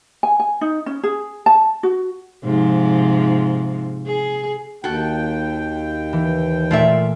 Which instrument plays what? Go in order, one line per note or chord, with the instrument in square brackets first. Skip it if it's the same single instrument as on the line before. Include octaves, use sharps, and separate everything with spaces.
[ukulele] G#5
G#5
D#4
C#4
G#4
A5
F#4
[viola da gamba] G#2 C3 F3
G#4
[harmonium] D#2 G5 [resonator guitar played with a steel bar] F#4 A4
[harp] E3
[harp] A#2 A3 [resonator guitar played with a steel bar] F4 D5 E5